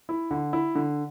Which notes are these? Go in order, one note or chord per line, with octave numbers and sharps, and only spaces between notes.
E4
D3
E4
D3